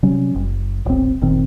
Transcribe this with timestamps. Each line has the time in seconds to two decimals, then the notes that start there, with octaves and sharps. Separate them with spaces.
0.03 C3 F#3 G3 C#4
0.35 F#1
0.85 D#1 A1 C4
1.21 F#1 A#2 D#3 C4